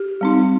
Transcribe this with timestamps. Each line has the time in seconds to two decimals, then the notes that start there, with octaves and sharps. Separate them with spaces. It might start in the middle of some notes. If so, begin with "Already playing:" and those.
Already playing: G4
0.21 G3 C4 D#4